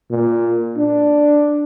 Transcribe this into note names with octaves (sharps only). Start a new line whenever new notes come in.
A#2
D4